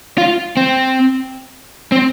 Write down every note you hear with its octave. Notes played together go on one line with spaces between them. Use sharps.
F4
C4
C4